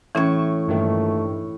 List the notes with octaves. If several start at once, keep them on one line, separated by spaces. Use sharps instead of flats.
A2 E3 C#4 C#6 G#6
G2 A#2 D#3 A3